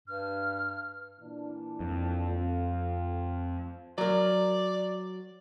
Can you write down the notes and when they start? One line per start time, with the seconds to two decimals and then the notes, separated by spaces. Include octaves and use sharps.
0.08 G2 F6
1.20 A#2 E3 D4
1.80 F2
2.29 A3 C4 F4
3.98 F#3 A#4 D5